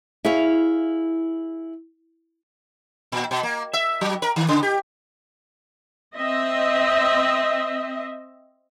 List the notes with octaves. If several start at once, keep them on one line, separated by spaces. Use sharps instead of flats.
E4 G#4 C#5 F5
A#2
B2
A#3
E5
F#3
A#4
D#3
C#3
G4
C4 D#5 E5